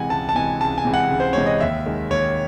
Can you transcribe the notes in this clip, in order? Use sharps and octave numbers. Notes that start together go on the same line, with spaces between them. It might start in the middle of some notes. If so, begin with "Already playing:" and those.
Already playing: C3 E3 G#3 F#5 G#5
C#2 A5
A5
C3 E3 G#3 G#5
C#2 A5
G#5
C3 E3 G#3
F#5
C#2
C5
C3 E3 G#3 C#5
D#5
D#2 E5
D#3 G#3
D#2 C#5